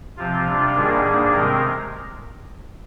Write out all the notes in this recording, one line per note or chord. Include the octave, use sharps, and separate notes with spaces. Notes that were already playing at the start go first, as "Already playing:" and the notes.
C3 F3 C4 F4
C3 G3 D4
G#2 D#3 G3 A#3 D4 G#4
G#2 G3 A#3 D4
C3 D#3 G#3 C4 A#4